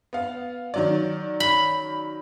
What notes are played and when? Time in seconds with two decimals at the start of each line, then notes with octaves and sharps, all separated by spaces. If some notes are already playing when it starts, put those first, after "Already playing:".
0.13 B3 F5
0.74 D#3 F#3 D5
1.40 B5